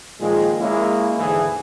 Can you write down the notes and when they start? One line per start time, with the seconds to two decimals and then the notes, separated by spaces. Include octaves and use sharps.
0.20 A#2 D#3 F3 G#3
0.60 G#3 A#3 C#4 E4
1.18 D#2 G#2 D3 E3 G#4